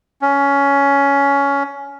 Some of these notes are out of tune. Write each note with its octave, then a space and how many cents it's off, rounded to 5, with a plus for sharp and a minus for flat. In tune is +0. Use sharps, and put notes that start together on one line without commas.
C#4 +15